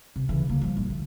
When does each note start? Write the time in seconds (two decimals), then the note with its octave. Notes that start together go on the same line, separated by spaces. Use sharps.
0.16 C3
0.29 C#3 E3
0.47 D3 A#3
0.61 F3 G3
0.77 A#1
0.90 D2